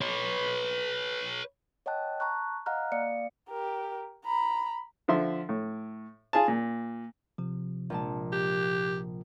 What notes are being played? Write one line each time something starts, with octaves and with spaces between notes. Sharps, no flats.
B4 C#5
C#5 D#5 F#5 G5 A5 F#6
A5 A#5 C#6 F#6
D#5 F5 F#5 A#5 F6 F#6
A#3 D5 F5 C#7
G4 A#4
A#5 B5
D3 F3 E5 C6
A2
F4 G#4 G#5 A5
A#2
C3 F3
A#1 G#3 A5
G4